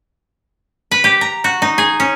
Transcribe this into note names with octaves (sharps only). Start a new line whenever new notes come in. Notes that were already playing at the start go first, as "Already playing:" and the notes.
B4
G4
A#5
F#4
D#4
G#4
C#4